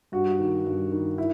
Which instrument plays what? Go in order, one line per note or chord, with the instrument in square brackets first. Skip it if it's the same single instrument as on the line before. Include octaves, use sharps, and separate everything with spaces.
[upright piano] G2 F#4
D#3
G2
D#3
E4